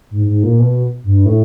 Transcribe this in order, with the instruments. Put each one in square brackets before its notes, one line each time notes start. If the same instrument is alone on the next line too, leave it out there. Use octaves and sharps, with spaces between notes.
[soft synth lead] G#2
G#2
A#2
B2
G2
A2